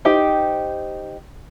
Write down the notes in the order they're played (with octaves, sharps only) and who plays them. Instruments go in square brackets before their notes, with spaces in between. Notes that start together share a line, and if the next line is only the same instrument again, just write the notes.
[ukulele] D#4 G4 C5 G5